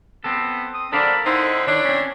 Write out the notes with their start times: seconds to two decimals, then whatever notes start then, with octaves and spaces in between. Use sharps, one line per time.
0.24 B3 C4 A4
0.74 D#6
0.93 D3 C4 D4 A4 A#4 F5 B5
1.25 D3 C4 D#4 E4
1.67 D#3 D4 C#5
1.85 C4 C#4